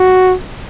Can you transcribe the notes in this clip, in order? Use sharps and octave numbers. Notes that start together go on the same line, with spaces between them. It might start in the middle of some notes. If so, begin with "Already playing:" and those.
Already playing: F#4